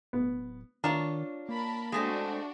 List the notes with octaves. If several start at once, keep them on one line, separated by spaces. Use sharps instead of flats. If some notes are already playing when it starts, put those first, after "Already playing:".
D1 B3
D#3 D4 F4 C#5 A#5 F6
A#3 A#4 A5 B5
G#3 A3 C4 D4 F#4